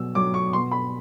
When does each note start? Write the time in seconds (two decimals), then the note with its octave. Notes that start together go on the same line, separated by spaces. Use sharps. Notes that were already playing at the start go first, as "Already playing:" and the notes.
Already playing: B2 F#3 E6
0.15 F#3 D6
0.34 C#6
0.53 B2 C6
0.71 B5